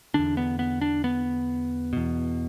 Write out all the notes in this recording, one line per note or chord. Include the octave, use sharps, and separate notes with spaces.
E2 D3 D4
B3
B3
D4
B3
E2 B2